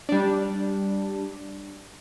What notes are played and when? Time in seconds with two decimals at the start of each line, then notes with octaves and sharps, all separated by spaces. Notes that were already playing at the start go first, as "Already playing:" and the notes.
0.09 G3 D4